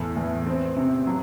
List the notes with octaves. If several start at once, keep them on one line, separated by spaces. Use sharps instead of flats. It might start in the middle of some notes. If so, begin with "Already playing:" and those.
Already playing: E2 A2
E2
C4
C3
F#3